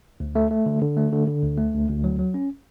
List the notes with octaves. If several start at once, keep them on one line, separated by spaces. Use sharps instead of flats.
D2
A3
A3
D3
D3
A3
D3
D3
D2
A3
D2
D2
F#3
F#3
C#4